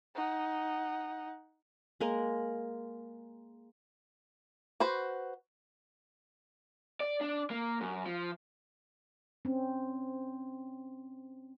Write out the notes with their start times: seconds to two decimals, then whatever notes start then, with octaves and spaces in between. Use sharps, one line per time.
0.15 D#4 F#5
2.00 G#3 A#3 A#4
4.80 F#4 B4 C5
7.00 D5
7.21 D4
7.50 A#3
7.81 F#2
8.06 F3
9.45 C4 C#4